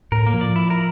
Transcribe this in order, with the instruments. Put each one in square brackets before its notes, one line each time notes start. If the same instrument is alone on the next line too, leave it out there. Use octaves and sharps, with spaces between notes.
[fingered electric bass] A2 [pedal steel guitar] A#4
[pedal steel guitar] A#3
[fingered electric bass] F3
[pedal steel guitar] D5
E4
A#4